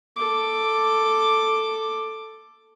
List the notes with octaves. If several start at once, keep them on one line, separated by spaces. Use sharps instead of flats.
A4 D6